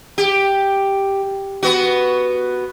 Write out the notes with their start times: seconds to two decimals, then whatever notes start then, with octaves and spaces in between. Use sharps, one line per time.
0.18 G4
1.63 B3 F#4